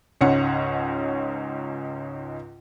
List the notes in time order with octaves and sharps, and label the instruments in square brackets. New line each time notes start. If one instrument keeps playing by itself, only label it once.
[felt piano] C#2 G#2 C#4 F#5 C#7